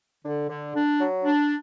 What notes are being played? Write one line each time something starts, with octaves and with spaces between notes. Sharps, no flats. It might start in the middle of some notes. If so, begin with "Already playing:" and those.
D3
D3
D4
F#3
D4